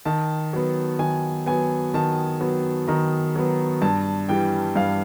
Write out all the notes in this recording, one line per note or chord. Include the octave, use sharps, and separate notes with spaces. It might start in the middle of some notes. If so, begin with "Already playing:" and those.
D#3 A5
F#3 B3
D#3 G#5
F#3 B3 G#5
D#3 A5
F#3 B3
D#3 A#5
F#3 B3
G2 A5
E3 G3 G5
G2 F5